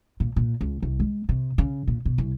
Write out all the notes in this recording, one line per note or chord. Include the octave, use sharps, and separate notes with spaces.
A#2
A#2
C#2
C2
G#3
C3
C#3
A#2
B2
C2